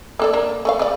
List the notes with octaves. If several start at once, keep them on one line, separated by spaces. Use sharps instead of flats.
A#3 A4 D5
A#3 D4 A#4
A3 A4 F5
C#3 D5